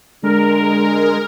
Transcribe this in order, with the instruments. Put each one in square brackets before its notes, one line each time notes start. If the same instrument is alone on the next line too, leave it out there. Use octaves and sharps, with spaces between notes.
[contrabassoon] D3 [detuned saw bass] G#3 [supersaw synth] A#4